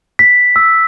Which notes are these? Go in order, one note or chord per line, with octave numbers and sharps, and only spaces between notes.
B6
E6